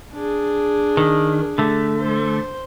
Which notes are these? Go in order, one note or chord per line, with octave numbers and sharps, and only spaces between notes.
D4 G#4
D#3
D3 A3
C5